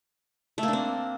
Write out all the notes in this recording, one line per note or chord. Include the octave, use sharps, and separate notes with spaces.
A3
A#3
D4
C4